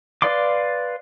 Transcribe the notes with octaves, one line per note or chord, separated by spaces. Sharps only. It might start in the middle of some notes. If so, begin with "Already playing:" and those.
B4 D5 F5 C6 D6